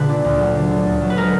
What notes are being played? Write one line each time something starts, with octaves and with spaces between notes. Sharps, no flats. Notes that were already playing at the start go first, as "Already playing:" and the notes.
Already playing: A#2 D3 G#4 B4
D4
D2
F#3
D3
D4
D2
F#3
B4
G#3 A#4